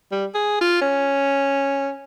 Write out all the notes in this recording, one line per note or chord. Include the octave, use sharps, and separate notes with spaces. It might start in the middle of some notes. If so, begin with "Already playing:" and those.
G3
G#4
F4
C#4